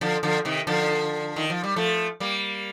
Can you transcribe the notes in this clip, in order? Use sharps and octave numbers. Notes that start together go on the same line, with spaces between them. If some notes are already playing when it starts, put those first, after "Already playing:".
D3 F3
D3 F3
C3 D#3
D3 F3
D#3
F3
G3
F3 A3
G3 A#3